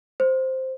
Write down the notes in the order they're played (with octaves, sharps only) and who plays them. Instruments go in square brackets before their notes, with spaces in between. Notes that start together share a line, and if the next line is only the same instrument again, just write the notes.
[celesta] C5